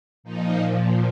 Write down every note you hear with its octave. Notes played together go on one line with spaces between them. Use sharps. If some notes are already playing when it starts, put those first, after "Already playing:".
A#2 F3 D#4